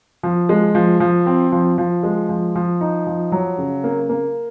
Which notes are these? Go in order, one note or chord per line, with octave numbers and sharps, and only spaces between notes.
F3
G#3
F3
F3
C4
F3
F3
G#3
F3
F3
D#4
F3
F#3
C#3
A#3
A#3